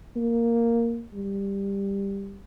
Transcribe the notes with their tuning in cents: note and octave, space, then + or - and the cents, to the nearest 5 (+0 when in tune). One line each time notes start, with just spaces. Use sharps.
A#3 -5
G3 +10